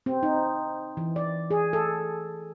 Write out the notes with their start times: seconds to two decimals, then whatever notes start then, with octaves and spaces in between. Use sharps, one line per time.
0.06 C4
0.23 D#4
0.97 E3
1.16 D5
1.51 G#4
1.73 A4